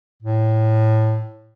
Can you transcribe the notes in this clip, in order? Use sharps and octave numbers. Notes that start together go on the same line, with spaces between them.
A2